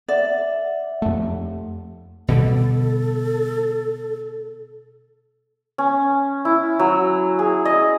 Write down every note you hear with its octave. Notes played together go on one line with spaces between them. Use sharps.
D5 E5 F#5
F2 A3
B2 D3 G3 A4
C#4
E4
F#3
G#4
D#5